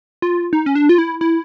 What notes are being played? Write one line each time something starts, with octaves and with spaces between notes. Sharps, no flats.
F4
D#4
C#4
D4
F4
E4
E4